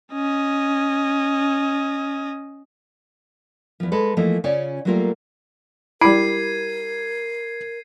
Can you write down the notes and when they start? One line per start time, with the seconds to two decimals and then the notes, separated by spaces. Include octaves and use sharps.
0.13 C#4 D#5
3.80 E2 F3
3.92 G#3 A4 B4
4.17 E3 F3 A3 A#3 E4 D#5
4.44 C#3 C#4 F4 C#5 D5
4.85 F#3 G3 A3 A#3 F4 A#4
6.01 G3 E4 A#4 B5 G#6 C7 D#7